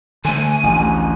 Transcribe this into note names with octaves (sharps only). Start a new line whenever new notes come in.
D3 A3 G#5
A1 D2